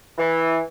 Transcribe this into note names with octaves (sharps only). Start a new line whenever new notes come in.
E3